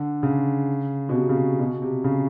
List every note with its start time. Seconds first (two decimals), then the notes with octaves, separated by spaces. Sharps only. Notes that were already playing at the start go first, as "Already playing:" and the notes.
Already playing: D3
0.23 C#3
1.09 B2
1.14 C3
1.29 C#3
1.59 B2
1.82 C3
2.04 C#3